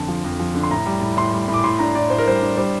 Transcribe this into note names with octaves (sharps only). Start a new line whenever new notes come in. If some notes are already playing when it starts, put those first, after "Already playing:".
Already playing: F2 D3 A5
F3
F2
F3
D3
C6
A2 A#5
G3
A2
A2 C6
G3
A2
D6
A2 C6
D4 A#5
A2 D5
A2 C5
A#4
G3 C5
D4
G3 C5